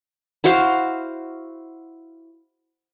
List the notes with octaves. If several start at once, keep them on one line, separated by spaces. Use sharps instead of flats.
E4 F#4 C5 F5